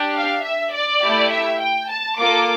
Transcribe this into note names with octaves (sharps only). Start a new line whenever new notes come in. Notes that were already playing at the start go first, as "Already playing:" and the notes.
Already playing: D4 G4
F5
E5
D5
A3 E4 G4
E5
G5
A5
A#3 F4 A4 D6